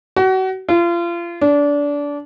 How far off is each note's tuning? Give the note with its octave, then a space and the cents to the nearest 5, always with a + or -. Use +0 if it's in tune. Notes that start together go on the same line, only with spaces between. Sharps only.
F#4 +30
F4 -30
D4 -25